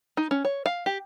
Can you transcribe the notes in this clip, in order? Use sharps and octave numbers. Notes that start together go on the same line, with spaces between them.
D#4
C#4
C#5
F5
G4